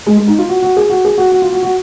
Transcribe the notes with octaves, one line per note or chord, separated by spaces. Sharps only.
G#3
G#3
D#4
F4
F#4
F#4
G#4
F#4
G#4
F#4
F#4
F4
F#4
F#4